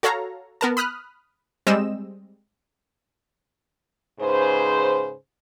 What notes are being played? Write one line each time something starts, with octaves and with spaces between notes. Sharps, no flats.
F#4 A4 C#5 F5 A#5
B3 A#4 A5
B5 D#6 F6 F#6
G3 G#3 C4 D#5 E6 E7
G#2 C#3 G#4 B4 C5